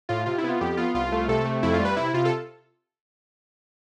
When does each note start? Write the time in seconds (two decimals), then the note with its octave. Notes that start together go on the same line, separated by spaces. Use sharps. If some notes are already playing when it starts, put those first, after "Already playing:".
0.09 A2 F4
0.26 C3 F4
0.38 E4
0.44 B3 F4
0.61 F2 G4
0.77 B3 F4
0.94 C2 F4
1.12 A3
1.28 C3 A4
1.45 A3
1.63 F2 E4
1.74 F4
1.80 G3
1.85 B4
1.96 C3 E4
2.14 C3 F4
2.25 A4